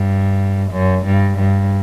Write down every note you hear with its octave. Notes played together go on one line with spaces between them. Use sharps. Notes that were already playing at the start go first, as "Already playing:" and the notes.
Already playing: G2
F#2
G2
G2